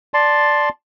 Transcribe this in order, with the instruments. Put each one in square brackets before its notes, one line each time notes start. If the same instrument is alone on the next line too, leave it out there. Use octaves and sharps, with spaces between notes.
[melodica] D5 A5 C6